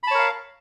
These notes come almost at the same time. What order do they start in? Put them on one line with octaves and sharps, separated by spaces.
B5 A5 C#5 A#4 F5